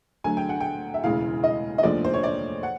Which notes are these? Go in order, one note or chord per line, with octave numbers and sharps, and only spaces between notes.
D2 D3 F#3 G#5
G5
F#5
G5
E5
E1 D2 C#3 E3 F5
D#5
D#5
F1 D#2 D3 F3 D5
C5
C#5
D5
F#5